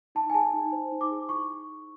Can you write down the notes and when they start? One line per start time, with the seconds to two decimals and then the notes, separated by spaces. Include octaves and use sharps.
0.15 D#4 A5
0.30 G#5
0.34 G#4 A5
0.53 D#4
0.73 C5
0.92 D#4
1.01 D6
1.11 G#4
1.29 E4 C#6